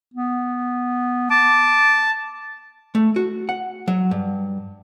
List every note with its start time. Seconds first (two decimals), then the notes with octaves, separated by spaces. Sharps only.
0.14 B3
1.30 A5 D6
2.95 A3
3.16 F#4
3.49 F#5
3.88 F#3
4.11 G2